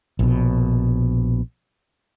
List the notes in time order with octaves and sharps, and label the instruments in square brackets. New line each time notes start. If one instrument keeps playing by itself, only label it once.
[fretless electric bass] A#1 B2